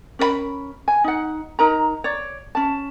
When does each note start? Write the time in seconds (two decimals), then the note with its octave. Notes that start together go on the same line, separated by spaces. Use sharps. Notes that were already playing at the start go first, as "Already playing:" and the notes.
0.19 C#4 A#4 D5 B5
0.88 G#5
1.04 D#4 F#5
1.59 D#4 A#4 A#5
2.04 C#5 D5
2.55 C#4 A5